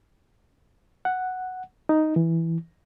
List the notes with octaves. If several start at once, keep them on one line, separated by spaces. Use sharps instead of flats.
F#5
D#4
E3